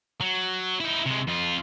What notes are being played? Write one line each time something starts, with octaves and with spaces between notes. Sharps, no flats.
F#3
D#4 E4
C3 G#3
F2 F4